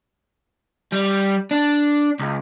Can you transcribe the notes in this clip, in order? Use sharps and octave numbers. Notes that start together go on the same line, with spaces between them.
G3
D4
C#2